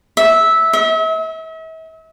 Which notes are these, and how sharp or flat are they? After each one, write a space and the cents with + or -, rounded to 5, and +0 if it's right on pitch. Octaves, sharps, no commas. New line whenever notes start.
E5 -10
E5 -40